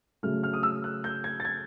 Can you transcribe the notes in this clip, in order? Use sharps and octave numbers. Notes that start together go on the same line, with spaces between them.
C#3 F#3 A3 F6
F6
D#6
E6
F#6
G6
G#6
A6
G#6